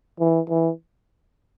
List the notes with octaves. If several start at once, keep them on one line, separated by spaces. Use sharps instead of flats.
E3
E3